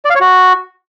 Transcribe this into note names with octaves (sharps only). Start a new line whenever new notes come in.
D5
F5
C#5
F#4